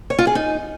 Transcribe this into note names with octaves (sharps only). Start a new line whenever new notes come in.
C#5
F4
G#4
D#4